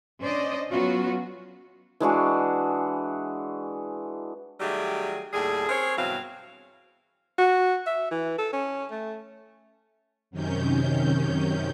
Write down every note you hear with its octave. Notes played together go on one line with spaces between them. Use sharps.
C#4 D4 C5 D5 D#5
F#3 B3 C#4 F4 F#4
E3 G#3 D4 F#4
D#3 F#3 G3 A3 G4 G#4
D#2 A2 G3 G#4
C4 G#4 A#4 C5 C#5
G2 B2 E3 F#3 C4 F5
F#4
E5
E3
A4
C#4
A3
F#2 C3 D#3 C#4 G6